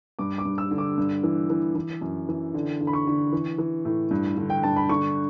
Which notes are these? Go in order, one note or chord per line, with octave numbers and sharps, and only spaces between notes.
G2 D6
D6
G2
E6
D3
D6
G2
E3
E3
E3
F#2
E3
D3
D3
B5
C#6
D3
E3
E3
A2
G2
D3
G5
G2 A5
B5
D3 C#6